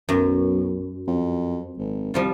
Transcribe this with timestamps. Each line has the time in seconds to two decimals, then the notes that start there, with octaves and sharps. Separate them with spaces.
0.09 B1 F#2
1.08 F2
1.78 G#1
2.14 C2 F3 G3 F4